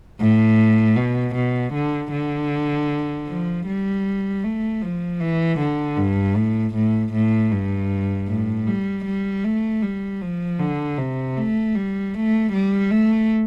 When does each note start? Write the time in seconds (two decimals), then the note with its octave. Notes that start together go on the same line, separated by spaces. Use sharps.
0.20 A2
0.97 B2
1.35 B2
1.73 D3
2.12 D3
3.28 F3
3.66 G3
4.44 A3
4.82 F3
5.20 E3
5.59 D3
5.97 G2
6.36 A2
6.74 A2
7.13 A2
7.52 G2
8.28 A2
8.67 G3
9.05 G3
9.44 A3
9.82 G3
10.22 F3
10.59 D3
10.98 C3
11.37 A3
11.75 G3
12.14 A3
12.52 G3
12.91 A3